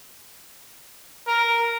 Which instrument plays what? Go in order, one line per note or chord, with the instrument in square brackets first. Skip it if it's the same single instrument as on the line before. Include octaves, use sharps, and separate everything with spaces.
[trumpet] A#4